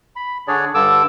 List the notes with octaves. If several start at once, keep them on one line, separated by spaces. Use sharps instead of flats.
B5
D3 D4 G#4 C#5 D5
G2 D3 A4 D6 E6